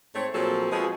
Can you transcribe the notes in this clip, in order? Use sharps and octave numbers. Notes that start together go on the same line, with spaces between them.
G#2 A3 C4 C#5
A#2 F3 F#3 C4 G#4 A4
B2 F3 G#3 F#4 G#4